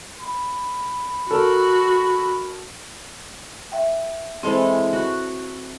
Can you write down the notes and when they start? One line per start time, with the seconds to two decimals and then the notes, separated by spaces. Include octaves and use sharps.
0.20 B5
1.31 F#4 A4 A#4
3.72 E5 G5
4.43 E3 G#3 C4 A4 C5
4.93 F#4